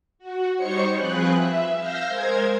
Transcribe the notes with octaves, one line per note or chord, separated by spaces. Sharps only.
F#4
G3 D#4 C5 C#5 C#6 C#7
F3 C4 G#4 B4 F#6
E5
F5 E6 F6 G6 A#6
G#3 A#4 C5 G#6